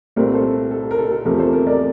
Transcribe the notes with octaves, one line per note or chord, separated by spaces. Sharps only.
C2 A#2 A3 C4 A#4
A4 C5
A4
A#4
A4
A4
E2 C3 F3 A3 A#4
A4 C5
A#4
A#4 D5